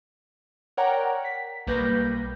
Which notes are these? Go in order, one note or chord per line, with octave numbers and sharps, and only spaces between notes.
A#4 C#5 D5 F#5 G5 A#5
B6
B1 G3 A#3 B4 G6 A#6